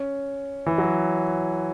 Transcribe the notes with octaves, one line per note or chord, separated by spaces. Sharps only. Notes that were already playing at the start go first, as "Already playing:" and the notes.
Already playing: C#4
E3
F#3